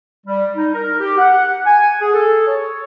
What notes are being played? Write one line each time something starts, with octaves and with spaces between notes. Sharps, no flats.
G3
D#4
A#4
G4
F#5
G#5
G#4
A4
C#5